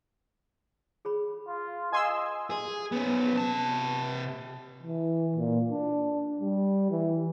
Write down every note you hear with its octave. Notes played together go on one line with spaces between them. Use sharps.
G#4 C#5 B5
F4
B4 D#5 F5 G#5 C6 E6
G#4
B3 C#4
C3 A5
E3
A#2
D4
G3
E3